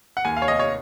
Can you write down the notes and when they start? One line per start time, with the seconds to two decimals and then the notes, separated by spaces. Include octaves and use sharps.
0.17 F#5
0.25 D#2 G#5
0.37 F5
0.42 C#5
0.48 F1 D#5
0.59 C#5